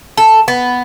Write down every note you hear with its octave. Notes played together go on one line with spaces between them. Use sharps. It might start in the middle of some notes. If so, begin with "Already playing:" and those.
A4
B3